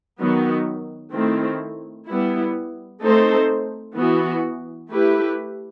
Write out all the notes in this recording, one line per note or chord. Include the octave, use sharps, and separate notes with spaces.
D#3 F#3 B3
D#3 A3 C4 E4
G3 B3 E4
A3 C4 D#4 A4 C5
E3 B3 F#4
A3 E4 G4 B4